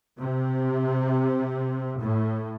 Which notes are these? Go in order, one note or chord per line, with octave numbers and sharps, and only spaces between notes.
C3
A2